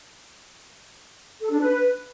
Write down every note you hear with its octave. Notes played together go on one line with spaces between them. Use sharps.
A4
D4
B4